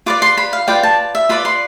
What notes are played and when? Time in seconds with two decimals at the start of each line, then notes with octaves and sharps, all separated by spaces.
0.06 F4 B4 D5 D6
0.22 C6
0.37 B5
0.53 F5
0.68 F4 B4 D5 G5
0.83 A5
1.15 E5
1.29 F4 B4 D5 B5
1.45 C6